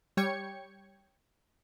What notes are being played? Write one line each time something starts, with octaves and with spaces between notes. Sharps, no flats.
G3 C#5 G5 G#6 C#7